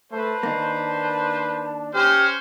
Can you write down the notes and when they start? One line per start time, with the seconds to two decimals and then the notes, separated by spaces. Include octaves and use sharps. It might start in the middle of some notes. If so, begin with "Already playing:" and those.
0.12 A3 B4 C5 A5
0.43 D#3 A#3 D4
1.93 C#4 G4 C5 F6